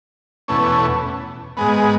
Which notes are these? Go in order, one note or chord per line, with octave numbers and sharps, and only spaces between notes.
E2 B2 A3 C#4
G#2 G#3 B3